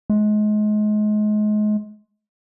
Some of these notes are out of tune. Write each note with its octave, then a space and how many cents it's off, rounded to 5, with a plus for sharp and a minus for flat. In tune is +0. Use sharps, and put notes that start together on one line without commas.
G#3 +30